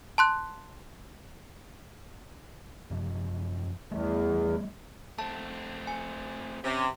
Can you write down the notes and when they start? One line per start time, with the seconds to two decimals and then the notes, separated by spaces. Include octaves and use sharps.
0.18 A5 C6 F#6
2.90 F#2 C3 F3
3.91 E2 G3 A3 B3
5.19 A3 C4 A5
5.87 G#5
6.64 C3 C#4